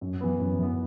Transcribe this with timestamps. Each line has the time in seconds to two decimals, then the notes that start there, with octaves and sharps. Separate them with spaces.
0.01 F#2
0.20 E3 B3
0.40 F#2
0.59 E3 B3